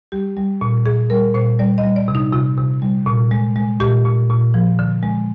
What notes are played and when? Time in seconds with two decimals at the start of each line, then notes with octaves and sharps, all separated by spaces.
0.12 G3 G4
0.37 G3
0.61 A#2
0.85 A#2 G#4
1.10 G3 A#4
1.34 A#2 C5
1.59 G3 D5
1.78 D#5
1.84 G3
1.96 D5
2.08 C3
2.15 D#4
2.33 C3 F4
2.58 C3
2.82 G3
3.06 A#2
3.31 G#3
3.56 G#3
3.80 A#2 G4
4.05 A#2
4.30 A#2
4.54 F3
4.79 D3
5.03 G#3